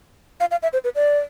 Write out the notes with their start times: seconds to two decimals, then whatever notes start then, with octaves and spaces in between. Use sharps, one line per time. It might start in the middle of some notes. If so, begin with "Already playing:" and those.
0.40 F5
0.51 F5
0.63 E5
0.73 C5
0.84 B4
0.95 D5